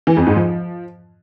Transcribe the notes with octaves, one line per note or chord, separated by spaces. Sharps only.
E3
F2
G#2
F3